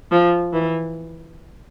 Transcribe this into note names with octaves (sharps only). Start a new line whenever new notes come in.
F3
E3